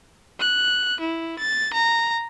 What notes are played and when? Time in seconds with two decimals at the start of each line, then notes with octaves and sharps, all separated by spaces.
0.40 F#6
1.00 E4
1.39 A6
1.74 A#5